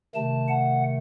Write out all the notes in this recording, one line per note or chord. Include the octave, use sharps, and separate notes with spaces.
C3 D#3 A3 A5
F#5